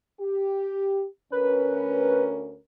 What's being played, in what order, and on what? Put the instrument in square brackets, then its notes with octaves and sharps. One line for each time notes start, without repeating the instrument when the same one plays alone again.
[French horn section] G4
[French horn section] D2 C#4 A#4 [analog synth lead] B4